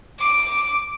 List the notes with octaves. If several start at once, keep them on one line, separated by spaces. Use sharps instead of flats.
D6